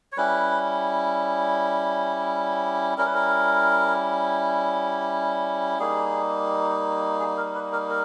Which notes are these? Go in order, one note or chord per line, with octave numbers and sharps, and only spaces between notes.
C#5
G3 C#4 E4 B4
G3 C#4 E4 A#4
B4
A#4
G3 A#3 D#4 G#4
G#4
A#4
B4
A#4
A#4